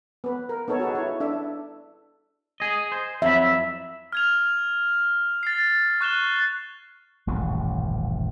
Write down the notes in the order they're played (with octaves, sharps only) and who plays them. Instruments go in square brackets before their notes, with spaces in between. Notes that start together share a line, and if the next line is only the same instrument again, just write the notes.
[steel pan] B3 B4
A#4
B3 D#4 A4 C#5
F#4 G#4 A4 B4
E4 C#5
D4 A4 E5
[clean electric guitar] G#4 D#5
C5
[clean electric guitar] F2 F#3 B5 [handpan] E5
[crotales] F6 G#6 F7
A6 C7
C#6 F#6 E7 G7
[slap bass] D#1 A1 F#2 C#3